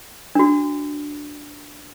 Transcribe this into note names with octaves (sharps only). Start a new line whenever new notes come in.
D4 F#4